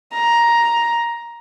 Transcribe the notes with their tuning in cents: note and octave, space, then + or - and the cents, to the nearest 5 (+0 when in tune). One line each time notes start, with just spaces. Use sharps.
A#5 +10